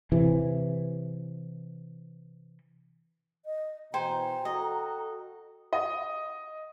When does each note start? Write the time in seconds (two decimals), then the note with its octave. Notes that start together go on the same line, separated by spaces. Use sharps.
0.12 C3 E3
3.45 D#5
3.94 B2 E3 C5 G5 G#5 A#5
4.45 F#4 A4 D#5
5.73 D#5